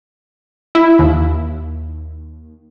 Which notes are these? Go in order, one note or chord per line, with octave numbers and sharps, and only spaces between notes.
E4
D#2